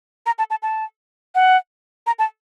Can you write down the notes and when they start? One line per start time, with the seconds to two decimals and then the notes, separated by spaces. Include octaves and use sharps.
0.26 A#5
0.39 A5
0.50 A5
0.63 A5
1.35 F#5
2.07 A#5
2.19 A5